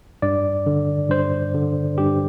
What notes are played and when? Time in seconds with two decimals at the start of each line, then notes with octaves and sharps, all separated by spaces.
0.22 G2 D5
0.66 D3
1.10 G2 C5
1.54 D3
1.98 G2 G4